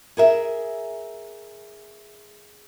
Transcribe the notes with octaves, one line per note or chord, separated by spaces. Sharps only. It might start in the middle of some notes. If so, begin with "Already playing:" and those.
G#4 A#4 E5